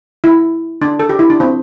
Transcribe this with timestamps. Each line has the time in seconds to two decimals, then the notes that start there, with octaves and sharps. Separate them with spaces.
0.24 E4
0.82 D4
0.99 A4
1.09 G4
1.19 E4
1.30 D4
1.40 C4